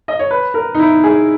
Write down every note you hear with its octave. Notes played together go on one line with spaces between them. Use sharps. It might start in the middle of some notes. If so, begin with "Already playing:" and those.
D#5
C#5
B4
A#4
D#4
E4
G#4